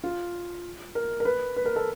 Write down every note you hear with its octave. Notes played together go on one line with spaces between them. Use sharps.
F4
A#4
A#4
B4
B4
A#4
A4